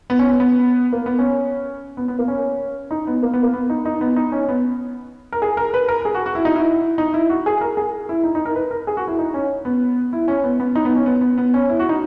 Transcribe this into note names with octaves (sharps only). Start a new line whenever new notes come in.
B3
C#4
B3
B3
A#3
B3
C#4
B3
B3
A#3
C#4
D#4
B3
A#3
B3
A#3
B3
D#4
D#4
B3
D#4
C#4
B3
A#4
G#4
A#4
B4
A#4
G#4
F#4
F#4
E4
D#4
E4
D#4
E4
F#4
G#4
A#4
G#4
E4
D#4
D#4
A#4
B4
A#4
G#4
F#4
E4
D#4
C#4
B3
E4
C#4
B3
B3
D#4
B3
C#4
B3
B3
B3
C#4
E4
F#4
D#4